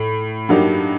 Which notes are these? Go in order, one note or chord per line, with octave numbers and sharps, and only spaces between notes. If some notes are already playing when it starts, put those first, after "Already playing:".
Already playing: A2
G2 F#3 A#3 D#4 G4